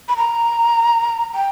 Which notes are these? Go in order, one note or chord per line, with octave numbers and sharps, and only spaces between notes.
B5
A#5
G5